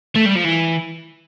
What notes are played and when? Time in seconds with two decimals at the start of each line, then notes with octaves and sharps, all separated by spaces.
0.16 A3
0.26 G3
0.36 F3
0.45 E3